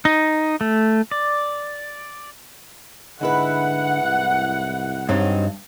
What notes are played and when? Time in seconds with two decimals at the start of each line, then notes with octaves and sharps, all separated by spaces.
0.05 D#4
0.61 A3
1.11 D5
3.21 G#2 D3 E4 B4 F#5
4.04 C2
5.09 G2 F#3 C4 D#4